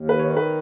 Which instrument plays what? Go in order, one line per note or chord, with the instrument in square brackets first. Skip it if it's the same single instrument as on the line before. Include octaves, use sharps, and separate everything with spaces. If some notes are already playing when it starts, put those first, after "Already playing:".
Already playing: [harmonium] D#2
[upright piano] B4
[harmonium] D#3 [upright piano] C#5
[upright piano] B4